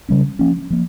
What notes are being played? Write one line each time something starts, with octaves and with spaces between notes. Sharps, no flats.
C#3 G3 C#4
F3 A#3 C#4
F3 A#3